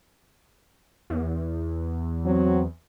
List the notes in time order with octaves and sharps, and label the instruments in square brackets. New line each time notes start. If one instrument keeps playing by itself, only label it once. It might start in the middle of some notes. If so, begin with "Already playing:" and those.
[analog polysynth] E2
[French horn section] F#3 C4